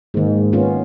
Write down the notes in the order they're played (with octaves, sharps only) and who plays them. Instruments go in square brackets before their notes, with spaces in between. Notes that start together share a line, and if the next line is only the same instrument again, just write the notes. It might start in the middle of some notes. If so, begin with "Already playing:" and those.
[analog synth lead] G#2 [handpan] D#3 A#3
[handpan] B3 C#4 F4